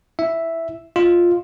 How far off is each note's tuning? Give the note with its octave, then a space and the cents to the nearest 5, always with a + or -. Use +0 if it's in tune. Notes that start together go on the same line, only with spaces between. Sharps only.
E4 +0 E5 +0
F4 +0 D#5 +0